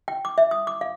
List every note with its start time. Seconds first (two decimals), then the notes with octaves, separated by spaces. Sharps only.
0.08 G5
0.25 D6
0.38 E5
0.51 D#6
0.67 D6
0.81 F5